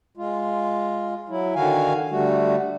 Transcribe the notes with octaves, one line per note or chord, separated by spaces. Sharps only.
G#3 F4
F#3 E4
D3 D#3 F#4 F5 G#5
D3 G3 A3 F#4